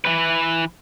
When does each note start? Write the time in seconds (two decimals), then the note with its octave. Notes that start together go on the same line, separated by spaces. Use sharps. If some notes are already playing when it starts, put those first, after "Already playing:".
0.05 E3 B4